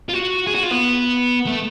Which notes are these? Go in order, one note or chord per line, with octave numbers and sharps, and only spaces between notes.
F4
F#4
G#4
F#4
F4
B3
A3